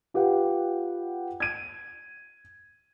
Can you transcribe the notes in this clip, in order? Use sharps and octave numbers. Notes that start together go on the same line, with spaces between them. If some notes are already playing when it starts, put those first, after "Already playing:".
F4 G4 B4 F#5 G5
G#6 D#7